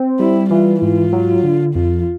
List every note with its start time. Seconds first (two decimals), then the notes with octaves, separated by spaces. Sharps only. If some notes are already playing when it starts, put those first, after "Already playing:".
Already playing: C4
0.19 G3 E4
0.50 E3 F4
0.81 G#2 F4
1.12 F#3
1.43 D3
1.75 F2 F4